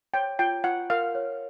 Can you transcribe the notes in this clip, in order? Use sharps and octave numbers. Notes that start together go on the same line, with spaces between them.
C#5 G5
F4 G5
F4 F#5
A#4 F5
C#5